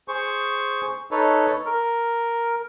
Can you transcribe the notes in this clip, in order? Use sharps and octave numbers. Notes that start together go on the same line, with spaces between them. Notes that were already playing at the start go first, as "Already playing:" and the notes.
G#4 C5 C#6
D#4 A4 B4 C#5
A#4